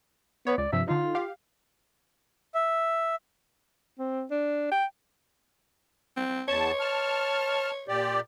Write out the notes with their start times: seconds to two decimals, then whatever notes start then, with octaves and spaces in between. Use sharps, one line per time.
0.47 B3 C#5
0.58 C#2 D5
0.73 G2 C3 F3 E5
0.88 D3 D#4 F4
1.15 G4 F5
2.54 E5
3.99 C4
4.30 D4
4.72 G5
6.16 C4
6.48 E2 C#5 A5
6.80 A5 F6
7.88 A#2 G4 D5